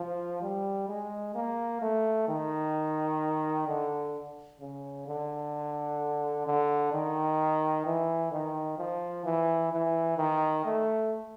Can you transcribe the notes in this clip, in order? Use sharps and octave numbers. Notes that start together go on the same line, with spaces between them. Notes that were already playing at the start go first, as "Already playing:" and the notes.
Already playing: F3
G3
G#3
A#3
A3
D#3
D3
C#3
D3
D3
D#3
E3
D#3
F3
E3
E3
D#3
A3